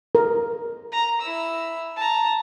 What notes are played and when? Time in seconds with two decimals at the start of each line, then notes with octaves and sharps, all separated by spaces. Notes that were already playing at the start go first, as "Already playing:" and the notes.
0.15 A#4
0.92 A#5
1.21 E4 E6
1.96 A5 A#5